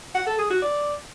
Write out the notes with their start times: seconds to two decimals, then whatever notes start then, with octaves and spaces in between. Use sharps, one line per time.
0.15 F#5
0.27 A4
0.38 G#4
0.50 F#4
0.62 D5